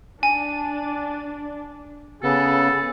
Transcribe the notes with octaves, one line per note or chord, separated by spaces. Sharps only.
D4 G#5
C#3 B3 G#4 A4